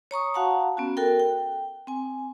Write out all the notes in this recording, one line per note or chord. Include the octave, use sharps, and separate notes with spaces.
C#5 A#5 C#6 D#6
F#4 F5 F#5 A5 A#5
B3 C#4 F#4
F#4 A4 A#4 G5
G5
C4 G#5